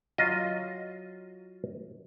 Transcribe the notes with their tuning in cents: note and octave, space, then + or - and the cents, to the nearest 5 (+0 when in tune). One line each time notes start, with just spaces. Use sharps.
F#3 +0 F4 +0 D#5 +0